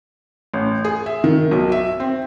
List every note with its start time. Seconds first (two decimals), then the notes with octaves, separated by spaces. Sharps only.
0.54 A1
0.85 G#4
1.06 E5
1.24 D#3
1.51 B1
1.72 E5
2.00 C4